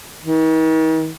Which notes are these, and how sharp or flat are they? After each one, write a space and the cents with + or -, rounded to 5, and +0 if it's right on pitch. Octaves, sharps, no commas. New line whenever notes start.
D#3 +45